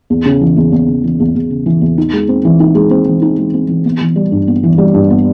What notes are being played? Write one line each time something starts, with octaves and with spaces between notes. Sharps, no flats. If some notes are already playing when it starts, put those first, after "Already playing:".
E2
C#3
E3
E2
E2
C#3
E3
E2
E2
C#3
E3
E2
D#4
G#3
C4
E3
D#4
G#3
C4
E3
D#4
G#3
C4
E3
B3
E3
G3
G2
B3
E3
G3
G2
B3